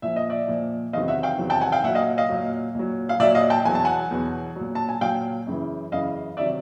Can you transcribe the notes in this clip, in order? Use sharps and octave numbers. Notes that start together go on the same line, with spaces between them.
A#2 F3 E5
D#5
D5 E5
A#2 F3
E2 C3 D#3 F#3 D#5 F5
E5 F#5
F5 G5
E2 C3 D#3 F#3
G5 A5
F#5 G#5
F5 G5
A#2 F#3 E5 F#5
D#5 F5
D#5 F5
A#2 F#3
A#2 F#3
F5
A#2 F#3 D5 E5
D#5 F5
G5 A5
E2 B2 F#3 G#5
A5
F#5 G#5
E2 B2 F#3
A#2 F#3
A5
G#5
A#2 F#3 F5 G5
F#2 C#3 E3
F#2 C#3 E3 D#5 F5
C3 D#3 F#3 D5 E5